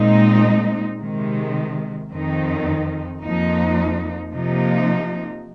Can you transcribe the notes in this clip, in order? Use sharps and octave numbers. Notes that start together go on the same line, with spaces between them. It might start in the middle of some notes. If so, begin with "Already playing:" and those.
Already playing: A#2 G#3 C4 D#4
C3 D#3 G#3
F2 D#3 C4 D#4
F2 F3 A#3 D#4
C3 F3 A#3 D#4